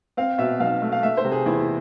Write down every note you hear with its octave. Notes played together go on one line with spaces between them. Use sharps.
C4 F5
B2 E5
B1 F5
A3
F5
A3 E5
C5
C3
G#4
E2 E4